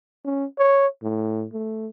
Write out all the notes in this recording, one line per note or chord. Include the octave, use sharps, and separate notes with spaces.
C#4
C#5
A2
A3